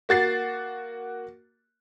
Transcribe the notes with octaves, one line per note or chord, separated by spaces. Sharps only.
A#3 F#4 A6 C7